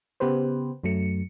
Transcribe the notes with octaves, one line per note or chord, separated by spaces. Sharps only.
C#3 B3 G4 B4 C5
F#2 F#3 A3 C#7